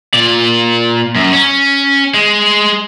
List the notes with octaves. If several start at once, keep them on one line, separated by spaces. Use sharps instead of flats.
A#2 D5
F#2
C#4
G#3